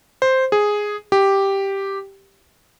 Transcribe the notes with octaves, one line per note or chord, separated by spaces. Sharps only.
C5
G#4
G4